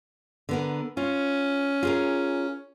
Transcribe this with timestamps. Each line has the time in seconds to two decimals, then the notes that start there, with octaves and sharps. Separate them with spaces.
0.49 D3 B3 A#4
0.97 C#4 F4
1.83 F4 G#4 A#4